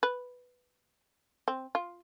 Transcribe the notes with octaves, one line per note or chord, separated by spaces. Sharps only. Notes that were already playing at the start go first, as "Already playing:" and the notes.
B4
C4
F4